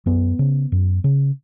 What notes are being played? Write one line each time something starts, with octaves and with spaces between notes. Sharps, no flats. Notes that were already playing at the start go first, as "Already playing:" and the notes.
F#2 B3
C#3
F#2
C#3